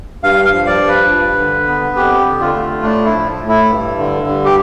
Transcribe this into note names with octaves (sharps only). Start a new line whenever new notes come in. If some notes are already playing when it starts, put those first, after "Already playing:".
G2 F5
F5
F3
D5
G2
B4
G2
D3
B3
F2 G4
D3
F4
A3
A2 D4
E4
F3
A2
E4
G2
D3
G2
G4